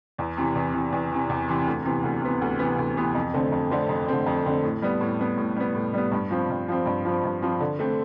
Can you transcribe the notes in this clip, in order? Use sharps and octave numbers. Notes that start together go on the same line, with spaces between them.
E2
C3 E3
E2
C3 E3
E2
C3 E3
E2
C3 E3
D2
C3 E3 B3
D2
C3 E3 B3
D2
C3 E3 B3
D2
C3 E3 B3
F2
D3 A3 C4
F2
D3 A3 C4
F2
D3 A3 C4
F2
D3 A3 C4
A2
G3 B3
A2
G3 B3
A2
G3 B3
A2
G3 B3
G2
F3 C4
G2
F3 C4
G2
F3 C4
G2
F3 C4
D3
A3 C4